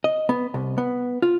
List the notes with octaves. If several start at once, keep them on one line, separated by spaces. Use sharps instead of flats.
D#5
B3
C2
B3
F4